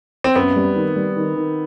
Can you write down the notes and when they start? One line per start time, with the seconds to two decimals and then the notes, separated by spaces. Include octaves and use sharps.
0.24 C4
0.36 F#2 B3
0.56 G3
0.75 D#3
0.96 G3
1.16 D#3
1.35 D#3